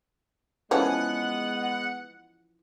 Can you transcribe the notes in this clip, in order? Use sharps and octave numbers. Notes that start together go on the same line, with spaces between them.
E3 F3 G#3 B3 C#4 F#5